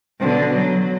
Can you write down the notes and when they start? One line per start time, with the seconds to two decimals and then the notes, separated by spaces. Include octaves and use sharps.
0.19 B2 D3
0.55 F#3